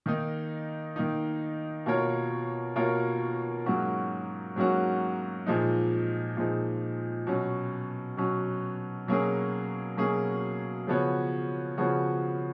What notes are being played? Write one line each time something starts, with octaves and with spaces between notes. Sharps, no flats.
D#3 A#3 D#4
D#3 A#3 D#4
B2 A#3 F4 A#4 C#5
B2 A#3 F4 A#4 C#5
G#2 F#3 A#3 C#4 F#4
G#2 F#3 A#3 C#4 F#4
A#2 F3 G#3 D#4
A#2 F3 G#3 D#4
B2 F#3 C#4
B2 F#3 C#4
B2 F#3 A#3 C#4 G#4
B2 F#3 A#3 C#4 G#4
C#3 F3 B3 F#4 C#5
C#3 F3 B3 F#4 C#5